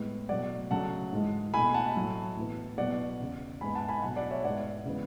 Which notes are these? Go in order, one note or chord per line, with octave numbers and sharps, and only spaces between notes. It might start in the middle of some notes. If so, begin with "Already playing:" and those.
Already playing: A2 G#3 B3
B2 F#3 A3 D5 F#5
C#3 F#3 A3 F#5 A5
G#2 E3 G#3
B2 A3 G#5 B5
F#5 A5
A2 F#3 A3
A2 E3 B3
B2 F#3 B3 D5 F#5
E2 C#3 E3
G#2 G#3 B3 G#5 B5
F#5 A5
G#5 B5
B2 F#3 A3 F#5 A5
D5 F#5
C#5 E5
G#2 G#3 B3 D5 F#5
C#3 E3 G#3 B3